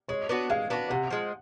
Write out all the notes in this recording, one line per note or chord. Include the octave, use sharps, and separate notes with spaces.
G#3 C#5
B3 D4 F#4
G#3 F5
B3 D4 F#4
C3 F#5
F3 G#3